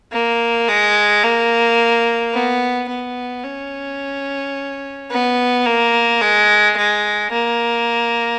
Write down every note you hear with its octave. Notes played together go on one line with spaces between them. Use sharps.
A#3
G#3
A#3
B3
B3
C#4
B3
A#3
G#3
G#3
A#3